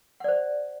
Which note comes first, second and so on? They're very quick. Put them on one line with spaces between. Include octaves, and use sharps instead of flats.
F#5 D5 C5